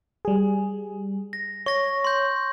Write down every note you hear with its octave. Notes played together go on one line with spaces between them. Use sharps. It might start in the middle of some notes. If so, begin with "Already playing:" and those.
G3 G#4
A#6
C#5 C#6 A#6
C6 G6